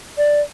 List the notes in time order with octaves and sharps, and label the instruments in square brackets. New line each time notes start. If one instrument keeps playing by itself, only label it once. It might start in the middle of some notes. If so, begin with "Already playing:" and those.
[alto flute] D5